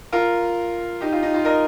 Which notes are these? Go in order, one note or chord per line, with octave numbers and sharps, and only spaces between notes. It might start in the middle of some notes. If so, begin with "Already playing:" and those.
F4 A#4
D#4 G4
F4
D#4
F4
A#4 D#5